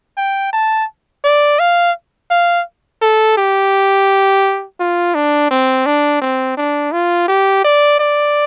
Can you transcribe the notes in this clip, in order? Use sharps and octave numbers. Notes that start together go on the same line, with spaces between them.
G5
A5
D5
F5
F5
A4
G4
F4
D4
C4
D4
C4
D4
F4
G4
D5
D5